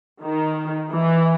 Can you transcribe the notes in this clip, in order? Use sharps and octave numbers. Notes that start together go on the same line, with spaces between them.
D#3
E3